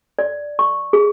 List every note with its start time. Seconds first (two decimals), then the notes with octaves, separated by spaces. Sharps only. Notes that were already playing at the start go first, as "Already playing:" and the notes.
0.19 D5
0.59 C#6
0.93 G#4